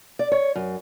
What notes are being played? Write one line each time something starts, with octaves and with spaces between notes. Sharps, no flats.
D5
C#5
F#2